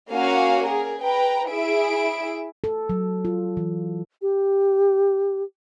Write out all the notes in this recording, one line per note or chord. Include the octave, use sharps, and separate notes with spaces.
A#3 C#4 F#4 F5 F#5 G#5
G#4 A#4
B4 G5 A#5
E4 G#4 E5 D7
A4
F#3
F4
E3
G4